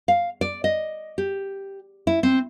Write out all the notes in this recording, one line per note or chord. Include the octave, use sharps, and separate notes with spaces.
F5
D5
D#5
G4
E4
C4